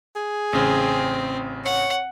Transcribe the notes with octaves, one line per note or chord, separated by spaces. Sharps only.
G#4
A1 C#3 C4
C#5 F#5